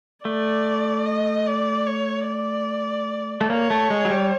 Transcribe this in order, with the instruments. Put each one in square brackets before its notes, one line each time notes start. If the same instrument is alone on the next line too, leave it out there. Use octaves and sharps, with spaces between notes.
[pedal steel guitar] A3 [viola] D5
[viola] D#5
D5
C#5
D5
[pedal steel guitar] A3
[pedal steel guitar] A#3 [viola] C#5
[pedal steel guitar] A3
G#3
F#3
G3